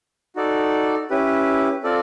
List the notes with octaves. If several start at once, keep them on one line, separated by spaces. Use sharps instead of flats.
D#4 F#4 A4 D5
C#4 E4 G4 B4
C4 F4 A4 D5